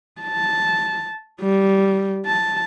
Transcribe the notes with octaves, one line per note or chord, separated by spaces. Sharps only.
A5
G3
A5